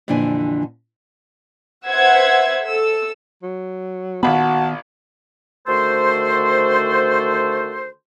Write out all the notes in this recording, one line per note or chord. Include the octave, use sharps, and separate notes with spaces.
F2 A#2 D3 E3 D4 G#5
B4 C5 E5 F#5 E6 G#6
A4 E6
F#3
A#1 D#3 B3 F#4 A5 B5
D3 D#3 A3 F#4 A4 C5